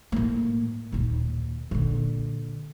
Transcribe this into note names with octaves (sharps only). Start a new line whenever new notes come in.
A2 A#3
D#2 A#2
A#2 D3